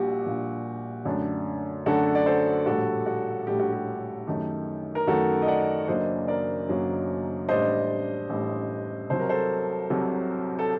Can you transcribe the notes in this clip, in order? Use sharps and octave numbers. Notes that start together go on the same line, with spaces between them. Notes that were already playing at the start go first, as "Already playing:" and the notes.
Already playing: A#1 A#2 G3 F#4 G4
A#1 A#2 G3
F#2 D3 A3 D4
F#2 D3 A3 D4 F#4 A4
D5
A4 C5
A#1 A2 G3 F#4 A4
F#4
A#1 A2 G3 G4
F#4
G4
F#2 D#3 A3
A#4
F#2 D#3 A3 F#4 A4
D#5
D5 F#5
F#1 F#2 F#3 A#3 D4 C5 D#5
A#4 D5
F#1 F#2 F#3 A#3 D4
A1 A2 G3 D4 C5 D#5
A1 A2 G3 D4
C2 C3 F#3 C5
A#4
A4 C5
C2 C3 F#3
A4